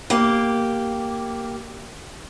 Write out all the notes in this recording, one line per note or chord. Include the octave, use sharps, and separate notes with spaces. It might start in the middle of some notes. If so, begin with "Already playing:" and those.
A#3 G4